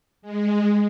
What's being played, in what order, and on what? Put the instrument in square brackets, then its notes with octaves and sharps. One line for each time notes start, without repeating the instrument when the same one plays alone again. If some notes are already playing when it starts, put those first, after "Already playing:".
[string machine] G#3